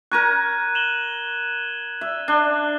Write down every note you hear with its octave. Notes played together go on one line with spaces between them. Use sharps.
A#4 A#5 C#6 F#6 G#6 D#7
E7 F#7 G7
E5
D4 F#6 G7